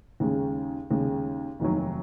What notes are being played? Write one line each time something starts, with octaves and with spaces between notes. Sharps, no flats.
D#2 C#3 G#3
D#2 C#3 G#3
F1 D#2 D#3 F#3